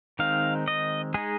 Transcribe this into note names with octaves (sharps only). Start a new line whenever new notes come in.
D#3 G#3 C4 D#4 F5
D#5
G#3 D#4 G#4